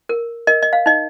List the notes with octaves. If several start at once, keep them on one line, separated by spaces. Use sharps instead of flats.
A#4
A#4 D#5
D#5
F5
D#4 D#5